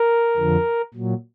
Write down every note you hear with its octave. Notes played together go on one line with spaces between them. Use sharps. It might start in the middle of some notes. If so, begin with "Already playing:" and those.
Already playing: A#4
F2 D3 F3
A#2 F#3